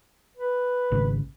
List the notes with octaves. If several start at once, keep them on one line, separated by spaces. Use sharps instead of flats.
B4
G#1 C#3